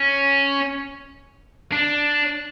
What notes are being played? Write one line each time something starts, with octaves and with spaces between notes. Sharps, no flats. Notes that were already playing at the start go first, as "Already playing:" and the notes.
Already playing: C#4
D4